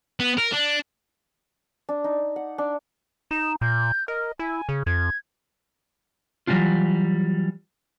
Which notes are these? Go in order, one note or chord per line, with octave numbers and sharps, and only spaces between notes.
B3
A#4
D4
D4
D#4
F#5
D4
D#4 E7
A#2 G6
A#4 D#5
E4 G#5
C#3
F2 G#6
E3 F#3 G3 C#4 D4 F4